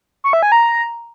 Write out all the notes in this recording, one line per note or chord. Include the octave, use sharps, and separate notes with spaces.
C#6
E5
G#5
A#5